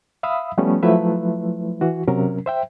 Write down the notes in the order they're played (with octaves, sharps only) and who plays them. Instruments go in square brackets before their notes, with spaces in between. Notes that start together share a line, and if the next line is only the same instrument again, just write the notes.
[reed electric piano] E5 F5 B5 D#6 E6
F3 G3 A3 B3 C#4
F3 F#3 A3 E4 B4 E5
E3 F#4
C3 F#3 C#4 A#4
C5 E5 G5